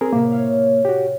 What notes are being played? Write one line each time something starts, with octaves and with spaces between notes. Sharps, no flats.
C4 G#4 A#4
A2 C3 A#3 E5
C#5 E5 F5
F#4 G4